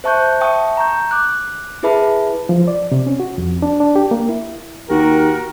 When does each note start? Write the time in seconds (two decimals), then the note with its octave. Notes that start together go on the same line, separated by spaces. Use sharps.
0.04 C5 E5 A5 C#6 F#6 G6
0.41 E5 G5 A5 C#6 D#6
0.77 A#5 C#6 G6
1.11 D6 F#6
1.83 E4 G#4 B4 E5 A5 B5
2.49 F3
2.68 D5
2.92 C3
3.07 C#4
3.20 F#4
3.38 F2
3.62 D4
3.80 D4
3.96 G4
4.11 A#3
4.29 E4
4.90 D#2 F#4 G4 A#4